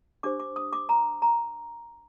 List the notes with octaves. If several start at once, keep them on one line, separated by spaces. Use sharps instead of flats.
D4 G4 C5 D6
D6
D#6
D6
A#5
A#5